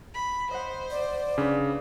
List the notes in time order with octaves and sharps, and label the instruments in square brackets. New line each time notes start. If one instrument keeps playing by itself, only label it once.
[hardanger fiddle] B5
[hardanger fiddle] C5 [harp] D#5 F#5
[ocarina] D5
[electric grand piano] C#3 [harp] D4 B4